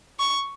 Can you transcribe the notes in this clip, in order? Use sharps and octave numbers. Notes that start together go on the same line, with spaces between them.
C#6